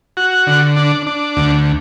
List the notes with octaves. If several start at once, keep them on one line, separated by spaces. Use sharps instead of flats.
F#4
D3
D4
D4
D2